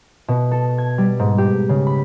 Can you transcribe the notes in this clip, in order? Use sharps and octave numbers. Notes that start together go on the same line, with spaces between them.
B2
A4
G#6
G3
G#2
G4
C#3
B5